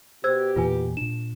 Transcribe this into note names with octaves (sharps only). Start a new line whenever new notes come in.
B2 G4 C5 E6 G#6
E2 A#2 E3 F4 B4 G#5
A#2 D4 E7